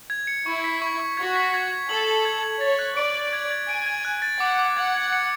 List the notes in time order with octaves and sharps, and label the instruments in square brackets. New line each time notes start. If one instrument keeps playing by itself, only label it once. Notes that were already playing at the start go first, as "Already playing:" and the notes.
[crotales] G#6
C#7
[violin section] E4 [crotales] C#6
[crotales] B6
C#6
C#6
[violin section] F#4 [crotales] G#6
[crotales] B6
G#6
G#6
[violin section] A4 [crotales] F#7
[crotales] F#7
G#6
G#6
[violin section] C#5 [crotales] A6
[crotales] F#6
[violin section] D5 [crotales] D7
[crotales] D7
G#6
G#6
[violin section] G#5 [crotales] D7
[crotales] G#6
F#6
A6
[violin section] F#5 [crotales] D6
[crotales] D6
[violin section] F#5 [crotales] G#6
[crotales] G#6
C#7